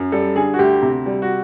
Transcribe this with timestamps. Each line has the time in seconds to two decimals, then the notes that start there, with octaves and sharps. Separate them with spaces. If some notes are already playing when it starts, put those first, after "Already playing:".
Already playing: F#2
0.12 G3 A4
0.36 D3 G#4
0.54 F#4
0.59 D2 G4
0.82 C3
1.06 G3
1.22 F#4